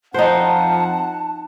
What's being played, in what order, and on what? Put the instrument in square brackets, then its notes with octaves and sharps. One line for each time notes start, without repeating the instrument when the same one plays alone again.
[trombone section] F2 F3 C4 [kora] D#4 C5 [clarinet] F#5 [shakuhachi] A5